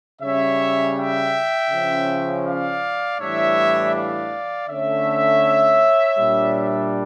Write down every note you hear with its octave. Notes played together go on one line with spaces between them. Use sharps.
C#3 G3 C#4 C#5 E5
E5 G5
C#3 F3 C#4
D5 F5
A2 E3 G3 D4 C#5 E5
D5 F5
D3 A3 C#4 C#5 E5
A#2 G3 D4